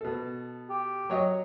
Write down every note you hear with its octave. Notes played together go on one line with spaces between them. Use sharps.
B2 A4
G4
F#3 C#5 D#5